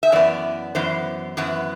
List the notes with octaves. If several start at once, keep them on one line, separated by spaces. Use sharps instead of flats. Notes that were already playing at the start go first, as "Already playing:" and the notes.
E5
F#2 E3 B3 D5
F#2 E3 B3 C5
F#2 E3 B3